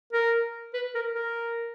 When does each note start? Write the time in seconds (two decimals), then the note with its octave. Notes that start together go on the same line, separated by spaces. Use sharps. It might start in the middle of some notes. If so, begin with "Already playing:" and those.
0.13 A#4
0.74 B4
0.95 A#4
1.15 A#4